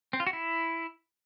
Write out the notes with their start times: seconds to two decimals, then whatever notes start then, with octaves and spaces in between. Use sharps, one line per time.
0.13 C4
0.20 F4
0.27 F#4
0.33 E4